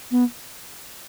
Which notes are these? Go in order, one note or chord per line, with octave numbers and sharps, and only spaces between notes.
B3